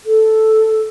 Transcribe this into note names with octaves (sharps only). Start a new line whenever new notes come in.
A4